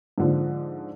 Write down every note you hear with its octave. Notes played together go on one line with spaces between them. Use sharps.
G#2 D3 F3